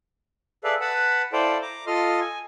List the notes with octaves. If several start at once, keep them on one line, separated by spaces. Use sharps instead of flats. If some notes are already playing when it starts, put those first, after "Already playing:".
G#4 A4 B4 D5 E5 F5
B4 F#5 A5 B5
E4 A4 C5 D5 F5 G5
A#5 D6
F4 A4 D#5 C6 F6
G#5